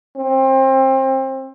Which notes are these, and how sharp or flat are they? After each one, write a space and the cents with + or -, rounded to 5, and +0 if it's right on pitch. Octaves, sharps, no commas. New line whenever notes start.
C4 +30